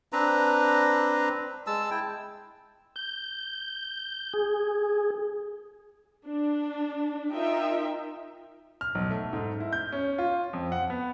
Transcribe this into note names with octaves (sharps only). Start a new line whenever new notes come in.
C4 D4 B4 A#5
G#3 A5 E6
E4 G5
G6
G#4
D4
D#4 F4 A#4 E5 G5
F6
B1
A3
G#2
E4
G6
C#4
F4
F2
F#5
B3